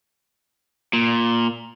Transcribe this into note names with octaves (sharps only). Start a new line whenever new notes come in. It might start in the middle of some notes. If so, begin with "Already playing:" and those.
A#2